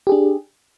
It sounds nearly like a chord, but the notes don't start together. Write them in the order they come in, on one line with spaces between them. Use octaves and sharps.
G4 G#4 D4